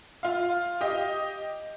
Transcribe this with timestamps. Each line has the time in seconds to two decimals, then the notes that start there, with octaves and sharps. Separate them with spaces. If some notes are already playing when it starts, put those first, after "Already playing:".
0.23 F4 F5
0.81 G4 D#5